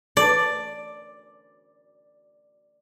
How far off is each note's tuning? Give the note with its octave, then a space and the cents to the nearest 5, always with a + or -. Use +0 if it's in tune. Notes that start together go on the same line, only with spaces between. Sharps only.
D5 +5